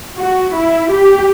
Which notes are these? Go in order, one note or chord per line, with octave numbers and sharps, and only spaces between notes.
F#4
E4
G4